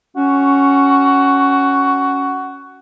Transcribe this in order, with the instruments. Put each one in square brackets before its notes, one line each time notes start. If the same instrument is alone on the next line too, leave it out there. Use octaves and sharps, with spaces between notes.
[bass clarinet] C#4 [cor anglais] F#4